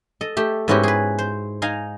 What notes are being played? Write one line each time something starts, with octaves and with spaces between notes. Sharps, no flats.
A4 D#5
A3 G4
G#2 B3 C#4 E4 F#4 G4
G#4 B4
C5
D#4 F5 G#5 A#5